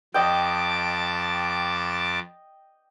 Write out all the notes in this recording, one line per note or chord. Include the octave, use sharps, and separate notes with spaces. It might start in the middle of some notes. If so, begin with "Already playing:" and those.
F2 D#5 G5 A5 D6